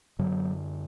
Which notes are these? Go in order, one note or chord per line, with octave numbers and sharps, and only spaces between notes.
F#2 D3 F#3